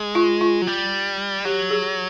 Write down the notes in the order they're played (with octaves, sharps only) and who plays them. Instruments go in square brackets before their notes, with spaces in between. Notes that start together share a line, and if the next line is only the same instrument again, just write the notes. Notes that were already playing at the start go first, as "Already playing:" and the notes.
Already playing: [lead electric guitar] G#3
[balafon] F4
F4
[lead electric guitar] F#3
G3
[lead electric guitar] F#3 [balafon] G4
[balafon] G#4